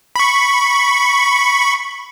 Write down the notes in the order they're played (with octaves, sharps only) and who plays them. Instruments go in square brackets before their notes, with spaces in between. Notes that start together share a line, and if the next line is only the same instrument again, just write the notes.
[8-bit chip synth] B5 C#6